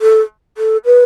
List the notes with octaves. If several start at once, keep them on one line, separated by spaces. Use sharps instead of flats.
A4
A4
B4